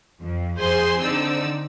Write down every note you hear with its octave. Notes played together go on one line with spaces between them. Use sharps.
F2
F2 G#4 C5 G#5 C6
D3 C4 D#4 D5 E6